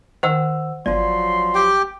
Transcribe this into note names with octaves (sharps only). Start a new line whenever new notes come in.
D#3 C5 F#5 E6
G1 F3 F#3 D5 C6
G4 G5